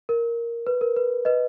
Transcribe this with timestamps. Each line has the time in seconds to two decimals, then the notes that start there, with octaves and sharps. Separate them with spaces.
0.09 A#4
0.67 B4
0.81 A#4
0.97 B4
1.25 B4 D#5